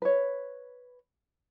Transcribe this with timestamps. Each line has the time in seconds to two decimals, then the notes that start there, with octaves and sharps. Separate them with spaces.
0.02 B4 C#5